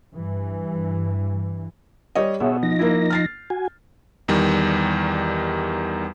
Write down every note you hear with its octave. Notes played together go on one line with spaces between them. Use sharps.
G2 E3
G3 C#5 D#5
B2 B3 G#4 C#5 E5
F3 D#4 A#6
A#3 E4
F6 A6 C7
F#4 G#5
E2 D#3 G3